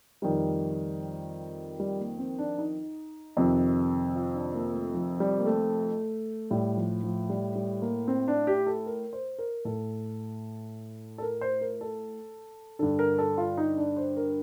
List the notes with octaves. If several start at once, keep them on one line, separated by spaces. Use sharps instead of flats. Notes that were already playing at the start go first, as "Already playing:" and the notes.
F2 D#3 G3
G3
A#3
C4
D4
D#4
F2 C3 D#3
F4
D4
A#3
A3
F3
G3
A#3
A3
A2 G3
F3
F3
G3
G3
A#3
C4
D4
G4
A4
A#4
C5
A#4
A2 A4
A4
A#4
C5
A#4
A4
G2 D3 A4
A#4
A4
F4
D#4
D4
C5
A#4